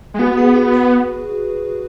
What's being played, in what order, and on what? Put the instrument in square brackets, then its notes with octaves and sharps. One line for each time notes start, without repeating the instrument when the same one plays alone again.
[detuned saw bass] G#3
[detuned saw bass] B3 [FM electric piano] F#4
[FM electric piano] G#4
F#4
B4